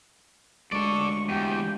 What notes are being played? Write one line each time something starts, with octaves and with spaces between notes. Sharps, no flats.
D2 G#3 A4 D5 C#6
E2 G4